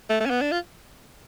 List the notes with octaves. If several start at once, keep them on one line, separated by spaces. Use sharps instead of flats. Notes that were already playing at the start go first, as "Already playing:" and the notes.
A3
A3
C#4
B3
D4
F4